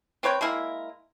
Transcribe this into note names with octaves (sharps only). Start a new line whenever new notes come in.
C4 B4 C#5 G5
G#3 A#3 E4 A#4